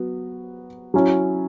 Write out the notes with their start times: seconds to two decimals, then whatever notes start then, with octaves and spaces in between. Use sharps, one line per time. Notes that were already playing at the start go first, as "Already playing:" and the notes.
Already playing: F#3 B3 F#4
0.94 F#3 C#4 E4